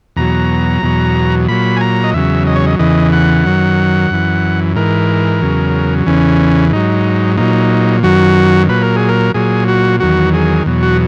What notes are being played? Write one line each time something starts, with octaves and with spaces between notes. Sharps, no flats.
E2 B2 F#3 A#5
E2 B2 F#3
A#2 F#3 B5
G#5
A#5
D#5
E2 C#3 F#3 E5
D#5
C#5
D#5
E2 C#3 E3 D#5
F#5
F#2 D#3 F#3
F#2 E3
G#2 E3 A#4
E2 C#3 F#3
E2 C#3 E3 C#4
G#2 F#3 D#4
A#2 F#3 D#4
F#2 D#3 F#3 F#4
A#2 F#3 B4
A#4
G#4
A#4
A#2 F#3 G#4
F#4
E2 D#3 F#3 F#4
G#4
E2 B2 F#3
F#4